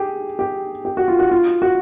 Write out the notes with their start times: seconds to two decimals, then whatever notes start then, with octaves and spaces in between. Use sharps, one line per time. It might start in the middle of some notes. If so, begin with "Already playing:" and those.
Already playing: G4 G#4
0.39 G4
0.85 G4
0.97 F#4
1.08 F4
1.19 F#4
1.31 F4
1.62 F#4